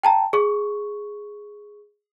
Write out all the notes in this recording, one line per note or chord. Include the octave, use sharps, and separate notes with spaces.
G5 A5 A#5
G#4 C#6